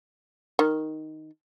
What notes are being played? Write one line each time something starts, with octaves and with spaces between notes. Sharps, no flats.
D#3